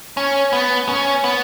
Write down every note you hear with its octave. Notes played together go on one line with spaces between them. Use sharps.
C#4
B3
C#4
B3